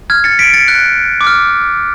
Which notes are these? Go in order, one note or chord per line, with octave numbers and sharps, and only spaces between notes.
F6 G#6
A6 C#7
B6 D7
A6 C#7
F#6
D6
F6